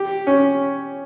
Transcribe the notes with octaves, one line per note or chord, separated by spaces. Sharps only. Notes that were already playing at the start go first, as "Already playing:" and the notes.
Already playing: G4
C#4